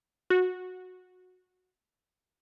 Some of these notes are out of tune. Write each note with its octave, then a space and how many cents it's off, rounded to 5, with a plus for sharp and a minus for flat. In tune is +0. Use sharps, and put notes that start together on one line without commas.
F#4 -15